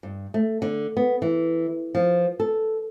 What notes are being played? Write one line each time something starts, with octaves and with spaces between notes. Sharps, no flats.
G2
A3
D3
B3
E3
F3
A4